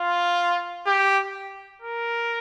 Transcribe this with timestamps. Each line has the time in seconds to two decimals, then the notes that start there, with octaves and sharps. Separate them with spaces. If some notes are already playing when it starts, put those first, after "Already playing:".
Already playing: F4
0.86 G4
1.82 A#4